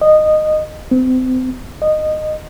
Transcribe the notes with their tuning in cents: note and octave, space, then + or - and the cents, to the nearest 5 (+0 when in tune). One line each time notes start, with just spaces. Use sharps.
D#5 -15
C4 -35
D#5 -15